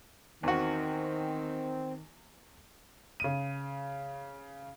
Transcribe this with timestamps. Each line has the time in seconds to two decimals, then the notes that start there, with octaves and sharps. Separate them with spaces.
0.43 E2 D#3 C4 F#4
3.20 C#3 D#7